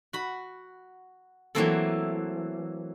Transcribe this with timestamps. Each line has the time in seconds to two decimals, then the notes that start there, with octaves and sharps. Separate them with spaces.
0.13 F#4 B5
1.55 E3 F#3 A3 A#3 C4 A4